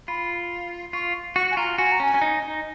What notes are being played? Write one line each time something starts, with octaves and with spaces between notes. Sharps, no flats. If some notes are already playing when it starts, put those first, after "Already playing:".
F4 B5
F4 C#6
F#4 C#6
G#5
F4 A#5
F#4 G#5
A#5
C#4 G#5
C#4
D#4
D#4